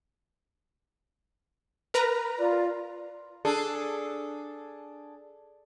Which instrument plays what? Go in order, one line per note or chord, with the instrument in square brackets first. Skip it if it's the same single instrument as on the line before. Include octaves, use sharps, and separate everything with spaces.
[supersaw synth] A#4 B4 A#5
[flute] F4 [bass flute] D5
[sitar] D4 G#4 A4